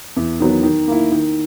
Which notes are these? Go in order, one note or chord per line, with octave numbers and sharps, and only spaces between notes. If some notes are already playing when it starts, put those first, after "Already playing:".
E2
D#3 F#3 B3
D#3
A#3 E4
D#3